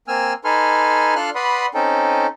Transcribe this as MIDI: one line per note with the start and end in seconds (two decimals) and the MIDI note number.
0.08 0.33 58
0.08 0.33 60
0.08 0.33 80
0.08 0.33 88
0.08 0.33 89
0.45 1.15 63
0.45 1.15 69
0.45 1.15 71
0.45 1.15 80
0.45 1.15 84
0.45 1.15 89
1.16 1.30 62
1.16 1.30 65
1.16 1.30 69
1.16 1.30 84
1.16 1.30 89
1.16 1.30 90
1.35 1.66 71
1.35 1.66 74
1.35 1.66 78
1.35 1.66 83
1.35 1.66 84
1.35 1.66 87
1.74 2.27 60
1.74 2.27 61
1.74 2.27 63
1.74 2.27 69
1.74 2.27 79